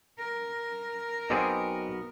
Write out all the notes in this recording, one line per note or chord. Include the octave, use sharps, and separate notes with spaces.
A#4
B1 B2 B3 C4 G#4 D5